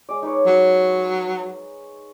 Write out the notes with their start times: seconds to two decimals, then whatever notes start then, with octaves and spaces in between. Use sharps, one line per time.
0.09 G#3 D5
0.23 D#4 B4 C#5
0.46 F#3